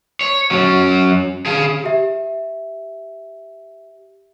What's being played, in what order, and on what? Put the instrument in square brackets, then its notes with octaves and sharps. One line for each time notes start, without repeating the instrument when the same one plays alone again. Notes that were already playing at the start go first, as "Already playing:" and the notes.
[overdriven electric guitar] C#5
F#3 C#4
G#4 F5
[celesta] G4 E5